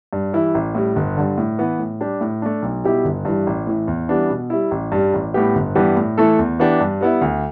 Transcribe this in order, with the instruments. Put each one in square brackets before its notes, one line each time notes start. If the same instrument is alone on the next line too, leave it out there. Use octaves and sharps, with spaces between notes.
[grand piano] G2
E3 G3 E4
A1
A2 G3
G1
G2 D3
A2
E3 B3
A2
G3 D4 G4
A2
A3 D4
B1
B2 G3 E4 G4
G1
G2 E3 G3
A1
A2 E3
E2
E3 G3 B3 D4
B2
G3 E4
A1
G2 G3
A1
A2 G3 B3 G4
G1
G2 E3 B3 G4
A2
E3 A3 E4 A4
E2
E3 B3 D4 G4
G2
G3 B3 E4
D2